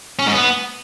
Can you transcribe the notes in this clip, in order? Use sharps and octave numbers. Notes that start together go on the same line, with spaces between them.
C#4
G#2
B3